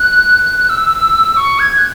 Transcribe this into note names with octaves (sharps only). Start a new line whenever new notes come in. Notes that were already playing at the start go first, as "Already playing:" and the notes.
Already playing: F#6
E6
C#6
G#6
F#6